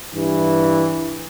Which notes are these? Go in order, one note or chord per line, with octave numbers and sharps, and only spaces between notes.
G2 E3